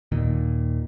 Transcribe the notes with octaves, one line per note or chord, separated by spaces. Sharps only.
D#2 A#2 D#3